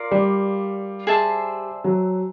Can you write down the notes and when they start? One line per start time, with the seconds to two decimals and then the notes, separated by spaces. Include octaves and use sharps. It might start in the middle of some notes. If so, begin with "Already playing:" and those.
Already playing: F4 A#4 D5 F5
0.11 G3
1.07 G#4 C5 E5 A5
1.84 F#3